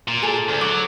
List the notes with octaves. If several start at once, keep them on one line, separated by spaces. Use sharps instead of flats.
A#2
G#4 A4
D2
F#3 D6